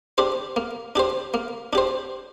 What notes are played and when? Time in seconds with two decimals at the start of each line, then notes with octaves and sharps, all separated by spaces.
0.18 D4 G4 C5
0.56 A#3
0.96 D4 G4 C5
1.34 A#3
1.73 D4 G4 C5